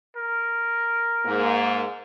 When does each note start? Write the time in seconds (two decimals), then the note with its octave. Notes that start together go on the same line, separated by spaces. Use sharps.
0.17 A#4
1.25 G#2 A#3